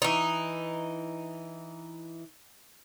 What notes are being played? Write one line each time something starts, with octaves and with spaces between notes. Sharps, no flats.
E3 D#4